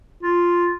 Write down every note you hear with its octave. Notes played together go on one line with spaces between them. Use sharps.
F4